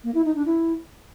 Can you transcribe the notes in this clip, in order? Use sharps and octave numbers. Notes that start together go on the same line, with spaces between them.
A#3
E4
D#4
D4
E4